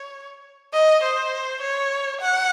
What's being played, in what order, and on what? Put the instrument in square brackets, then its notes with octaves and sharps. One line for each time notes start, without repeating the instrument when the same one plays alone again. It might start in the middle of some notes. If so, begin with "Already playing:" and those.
Already playing: [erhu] C#5
D#5
C5
C#5
F#5